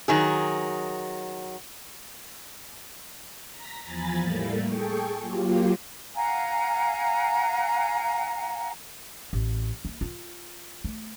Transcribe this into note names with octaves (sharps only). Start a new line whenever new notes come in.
D#3 F#3 G#4
A#5 A#6 B6
E2 F3 G#5 A#5 B5 A6
A2 G3 A3 A#3
G#4 A4 G5 C#6
F#3 A#3 F4 G4
F5 F#5 G#5 A#5
A1
A#3
F4
A3